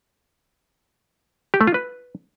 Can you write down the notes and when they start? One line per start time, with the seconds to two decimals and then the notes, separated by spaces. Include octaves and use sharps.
1.54 G4
1.61 A3
1.67 F4
1.74 B4